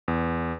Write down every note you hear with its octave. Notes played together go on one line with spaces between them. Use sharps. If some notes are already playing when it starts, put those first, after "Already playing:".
E2